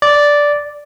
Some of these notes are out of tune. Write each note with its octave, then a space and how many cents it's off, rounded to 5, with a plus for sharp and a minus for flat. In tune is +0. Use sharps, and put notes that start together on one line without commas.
D5 -5